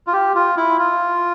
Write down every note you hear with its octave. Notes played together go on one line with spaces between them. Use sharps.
F4
G4
F4
E4
F4